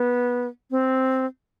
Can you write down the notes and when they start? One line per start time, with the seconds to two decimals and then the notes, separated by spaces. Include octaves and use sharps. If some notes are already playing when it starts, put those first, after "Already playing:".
Already playing: B3
0.71 C4